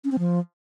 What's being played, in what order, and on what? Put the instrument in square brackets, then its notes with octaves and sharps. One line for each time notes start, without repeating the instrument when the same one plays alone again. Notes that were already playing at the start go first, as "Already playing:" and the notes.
[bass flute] C#4
C4
F3